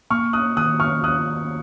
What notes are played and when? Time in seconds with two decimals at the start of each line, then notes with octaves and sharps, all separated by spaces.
0.10 A#3 C#6 F6
0.33 D#6 F#6
0.57 D#3 D#6 F#6
0.80 C#6 F6
1.03 D#2 D#6 F#6